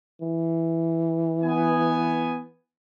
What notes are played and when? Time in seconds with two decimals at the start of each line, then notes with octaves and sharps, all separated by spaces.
0.21 E3
1.43 B3 G#5